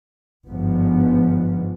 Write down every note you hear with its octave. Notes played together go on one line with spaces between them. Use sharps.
G1 G#2 F3 B3